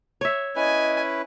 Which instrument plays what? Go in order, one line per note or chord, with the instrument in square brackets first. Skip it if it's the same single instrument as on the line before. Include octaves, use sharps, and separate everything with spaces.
[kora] C#5 E5
[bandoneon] C#4 E4 B4 [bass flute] D#5 [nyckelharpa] G#5